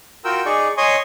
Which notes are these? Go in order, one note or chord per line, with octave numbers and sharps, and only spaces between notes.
F4 F#4 A#4 G5 E6
D#4 G#4 D5 C#6
C#5 D#5 G#5 C6 C#6 D#6